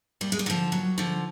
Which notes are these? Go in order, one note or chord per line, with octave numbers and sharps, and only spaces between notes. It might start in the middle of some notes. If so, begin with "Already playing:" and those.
D#2 G3
G#3
G3
D3 F3 F#3
D#2 F#3
D3 F3